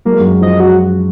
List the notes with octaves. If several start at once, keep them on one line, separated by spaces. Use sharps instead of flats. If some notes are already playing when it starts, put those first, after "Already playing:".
F#3 A#3
G#3
F#2 F#3
F3 D#5
F#4